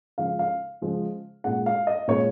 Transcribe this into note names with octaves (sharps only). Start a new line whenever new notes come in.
C#3 F3 G#3 F5
F5
C#3 F3 G#3
A#2 G#3 F#5
F5
D#5
A#2 G#3 C#5